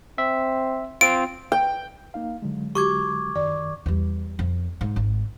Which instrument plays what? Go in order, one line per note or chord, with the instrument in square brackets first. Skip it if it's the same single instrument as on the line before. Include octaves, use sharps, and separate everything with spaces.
[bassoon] C4 [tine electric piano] E5
[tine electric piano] C4 F4 [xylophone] D7
[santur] G5
[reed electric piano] A#3 D#4 F5
D3 F#3 G#3
[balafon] F#4 G4 [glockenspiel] C#6 D6 G#6
[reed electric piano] F#2 D#3 [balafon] D5
[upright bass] E2 G3
F2
G#2
G#1